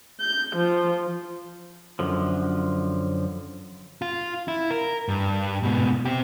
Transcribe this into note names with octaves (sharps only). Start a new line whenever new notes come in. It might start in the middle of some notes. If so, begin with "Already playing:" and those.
G6
F3
F#2 D3 F3
F4
E4
A#4
G2
G#2 B2
C4 G4